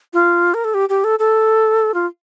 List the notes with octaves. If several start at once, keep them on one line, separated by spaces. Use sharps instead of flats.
F4
A#4
A4
G4
G4
A4
A4
F4